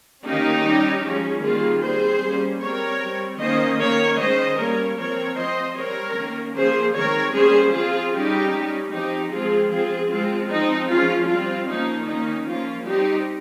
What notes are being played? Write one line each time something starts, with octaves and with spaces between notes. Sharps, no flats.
D#3 A#3 C#4 D#4 G4
G3 C#4
F3 G#3 C#4
D#3 G3 A#3 C#4 F4 G#4
G3 C4 G#4 C5
G3 A#3 C#4
G3 C4 A#4 C#5
G3 C4
D#3 A#3 C#4 C5 D#5
D#3 A#3 C#4 A#4 C#5
D#3 G#3 C#4 C5 D#5
G3 A#3 C#4 A#4 C#5
F3 C4 A#4 C#5
F3 C4 C5 D#5
G3 C4 A#4 C#5
D#3 A#3 C#4
F3 A#3 C#4 G#4 C5
D#3 G#3 C4 A#4 C#5
G3 A#3 C#4 G#4 C5
F3 C4 F4 G#4
G3 C#4 D#4 G4
G3 C#4
F3 C4 D#4 G4
F3 G#3 C4 F4 G#4
F3 C4 F4 G#4
F3 G#3 C4 F4
F3 C4 D#4
F3 G#3 C#4 F4
G3 C4 F4
F3 A#3 C#4 D#4
D#3 A#3 C#4 D#4
F3 A#3 C#4 F4
G3 C4 D#4 G4